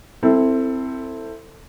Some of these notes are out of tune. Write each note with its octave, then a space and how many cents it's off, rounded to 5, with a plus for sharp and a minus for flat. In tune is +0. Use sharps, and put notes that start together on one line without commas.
C4 +0 E4 +0 A4 +20